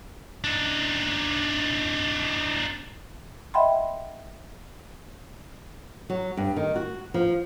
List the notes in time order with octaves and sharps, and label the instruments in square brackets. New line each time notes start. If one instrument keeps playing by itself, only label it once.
[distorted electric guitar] D4 D#4
[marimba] D#5 E5 F#5 G5 B5 C6
[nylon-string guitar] F#3
G2
D#3
F#4
F3